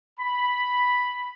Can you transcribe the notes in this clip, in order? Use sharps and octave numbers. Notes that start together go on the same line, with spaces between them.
B5